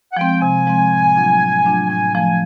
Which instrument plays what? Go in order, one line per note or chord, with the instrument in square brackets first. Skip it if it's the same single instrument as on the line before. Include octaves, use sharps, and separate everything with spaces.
[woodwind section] F#5
[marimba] F3 G#3 C4 [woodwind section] G5
[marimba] C3 [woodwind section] G#5
[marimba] F3 G#3 C4
A2
F#3 A3 D4 F4
A2
F#3 A3 D4 F4
[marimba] A2 [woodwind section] G#5
[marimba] F3 A3 [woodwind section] G#5